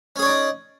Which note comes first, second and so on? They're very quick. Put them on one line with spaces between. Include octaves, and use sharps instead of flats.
C#4 G#4 C#5 D5 D#4